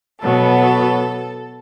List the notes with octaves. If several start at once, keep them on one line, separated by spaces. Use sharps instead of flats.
B2 F#3 B3 A4